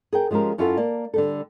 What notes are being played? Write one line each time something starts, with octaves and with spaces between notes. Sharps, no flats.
G#4 A#4 G5
F3 G#3 C#4 G4 A#4
F#2 C#4 E4 F4 A4 F#5
A#3 D5 A5
D3 G3 A4